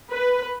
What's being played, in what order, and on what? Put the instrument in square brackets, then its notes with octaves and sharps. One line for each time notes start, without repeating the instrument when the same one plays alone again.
[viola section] B4